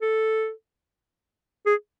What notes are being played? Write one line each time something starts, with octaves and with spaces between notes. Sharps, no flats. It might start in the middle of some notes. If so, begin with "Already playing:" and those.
A4
G#4